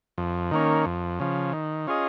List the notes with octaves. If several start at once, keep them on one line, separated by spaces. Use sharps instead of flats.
F2
D#3 A#3 C#4
F2
C#3 F3
D#3
C#4 F4 G#4 D#5